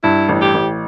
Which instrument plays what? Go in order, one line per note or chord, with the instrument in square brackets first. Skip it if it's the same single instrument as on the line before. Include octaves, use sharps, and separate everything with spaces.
[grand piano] G2 [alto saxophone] E4
[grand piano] A1
[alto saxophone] G4
[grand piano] A1